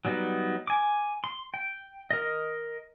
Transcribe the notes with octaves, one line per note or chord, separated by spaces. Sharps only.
F#3 G3 B3 D#4
G#5 D6
C6
G5
A#4 D#5